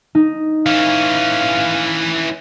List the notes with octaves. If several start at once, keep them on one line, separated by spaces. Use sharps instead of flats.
D#4
E3 C#4 F5